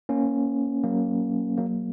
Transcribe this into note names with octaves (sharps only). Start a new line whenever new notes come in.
A#3 C#4
F#3 A#3
F#3 A#3